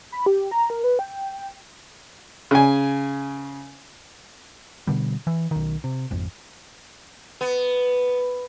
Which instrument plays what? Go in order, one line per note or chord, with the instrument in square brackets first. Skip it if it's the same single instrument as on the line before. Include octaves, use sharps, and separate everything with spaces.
[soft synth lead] B5
G4
A#5
A#4
B4
G5
[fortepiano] C#3 G#5
[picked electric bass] B2 D3 G3
E3
B1 D#3
C3
G#1 F2
[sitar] B3